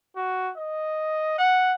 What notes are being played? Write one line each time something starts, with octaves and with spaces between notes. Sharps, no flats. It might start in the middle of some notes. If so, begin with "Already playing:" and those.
F#4
D#5
F#5